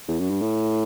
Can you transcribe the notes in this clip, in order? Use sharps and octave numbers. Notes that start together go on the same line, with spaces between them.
E2
F#2
G2
A2